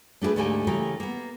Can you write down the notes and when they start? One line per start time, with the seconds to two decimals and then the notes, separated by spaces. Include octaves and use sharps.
0.21 A3 D4 G4 G#4 B4
0.36 D2 G#2 A3 A#3 G4 G#5
0.67 C#3 E3 A3 A#3 G4 A#4
1.00 A#3 B3